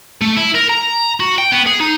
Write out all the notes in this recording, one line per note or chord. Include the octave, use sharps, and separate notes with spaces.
A3
E4
A#4
A#5
F#4
G5
B3
G#4
D#4